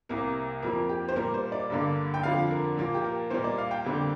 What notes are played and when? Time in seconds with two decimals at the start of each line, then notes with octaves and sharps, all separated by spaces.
0.09 C2 C3 A#3 A#4
0.62 F2 F3 A#3 A#4
0.89 G4
1.09 C5
1.16 A#2 G3 A#3 A#4
1.34 C5
1.52 D5
1.70 G2 D3 G3 A#3
2.14 G5
2.23 F2 D3 F3 F5
2.51 A#4
2.78 A#2 F3 A#3
2.94 G4
3.04 A#4
3.30 A#2 G3 A#3 C5
3.44 D5
3.58 F5
3.71 G5
3.85 F2 D3 G3 A#3